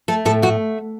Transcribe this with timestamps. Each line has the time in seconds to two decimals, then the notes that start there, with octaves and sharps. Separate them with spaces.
0.08 A3 A4
0.25 A2 A4
0.42 A3 F#4